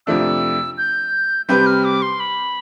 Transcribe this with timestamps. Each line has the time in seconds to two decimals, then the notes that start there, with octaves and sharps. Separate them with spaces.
0.07 F2 C3 F3 A3 D4 E6
0.78 G6
1.49 C3 G3 C4 G4 B4 G6
1.66 F6
1.84 D6
2.02 C6
2.20 B5